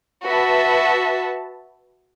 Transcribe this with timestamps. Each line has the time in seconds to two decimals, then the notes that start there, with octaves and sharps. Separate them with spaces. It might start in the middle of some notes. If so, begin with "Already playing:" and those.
0.25 F#4 B4 E5 A5